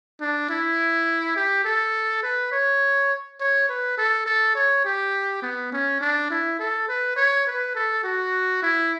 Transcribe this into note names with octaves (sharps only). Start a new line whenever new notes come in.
D4
E4
G4
A4
B4
C#5
C#5
B4
A4
A4
C#5
G4
B3
C#4
D4
E4
A4
B4
C#5
B4
A4
F#4
E4